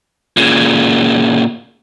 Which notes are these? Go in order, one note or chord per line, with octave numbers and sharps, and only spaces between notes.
A#2 C#3